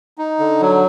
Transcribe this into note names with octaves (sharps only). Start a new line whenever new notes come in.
D#4
D3
F#3